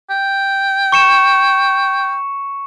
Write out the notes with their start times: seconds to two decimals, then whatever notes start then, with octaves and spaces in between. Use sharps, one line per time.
0.11 G5
0.92 C#6 C#7 E7